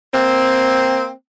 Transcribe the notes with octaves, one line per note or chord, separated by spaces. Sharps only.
A#3 C4